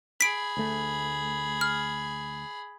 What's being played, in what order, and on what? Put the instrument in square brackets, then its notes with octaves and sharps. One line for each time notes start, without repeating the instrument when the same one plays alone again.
[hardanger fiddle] G#4 B5 [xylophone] B6 D7
[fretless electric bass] D2 A3
[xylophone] F6